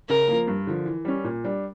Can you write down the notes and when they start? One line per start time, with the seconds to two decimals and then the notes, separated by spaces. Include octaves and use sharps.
0.08 C#3 A#4
0.28 F3 A#3
0.48 G2
0.67 D3 F3
0.86 E3
1.05 G3 C#4
1.24 A#2
1.44 G3 D4